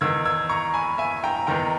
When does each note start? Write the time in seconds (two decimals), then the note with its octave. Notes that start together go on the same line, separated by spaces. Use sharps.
0.01 E2 D#3 E6 G#6
0.25 E6 G#6
0.49 A#5 C#6
0.74 G#5 B5
0.98 E5 G#5
1.24 G5 A#5
1.47 E2 D#3 G5 A#5